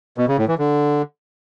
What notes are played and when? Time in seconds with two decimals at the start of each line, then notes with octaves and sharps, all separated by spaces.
0.18 B2
0.28 C#3
0.38 A2
0.48 E3
0.58 D3